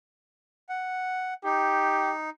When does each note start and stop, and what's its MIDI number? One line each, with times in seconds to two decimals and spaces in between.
0.69 1.34 78
1.44 2.30 63
1.44 2.11 67